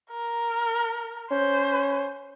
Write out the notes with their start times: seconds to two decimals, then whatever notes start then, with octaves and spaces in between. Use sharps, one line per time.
0.11 A#4
1.31 C#4 C5